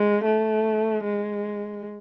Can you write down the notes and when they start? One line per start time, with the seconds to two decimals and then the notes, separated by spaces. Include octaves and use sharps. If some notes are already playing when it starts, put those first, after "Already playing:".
Already playing: G#3
0.25 A3
1.04 G#3